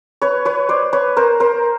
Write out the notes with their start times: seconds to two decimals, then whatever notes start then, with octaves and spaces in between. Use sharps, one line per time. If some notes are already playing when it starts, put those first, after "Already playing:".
0.22 B4 C#5
0.45 B4 C#5
0.69 C5 D5
0.93 B4 C#5
1.17 A#4 C5
1.40 A#4 C5